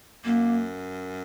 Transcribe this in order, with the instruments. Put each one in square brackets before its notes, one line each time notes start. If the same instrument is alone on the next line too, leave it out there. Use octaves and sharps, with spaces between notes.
[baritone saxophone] F#2 [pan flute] A#3